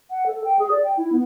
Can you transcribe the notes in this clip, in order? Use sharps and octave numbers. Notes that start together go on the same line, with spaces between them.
F#5
A4
G5
G#4
D5
G5
E4
B3